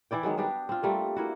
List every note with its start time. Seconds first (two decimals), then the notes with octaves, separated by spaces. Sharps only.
0.11 E3 E4 D5 G5
0.23 D#3 F#3 G#3 B3
0.37 G3 B3 D4 G4
0.69 C4 F4
0.83 G3 A3 A#3
1.16 A#3 E4 F#4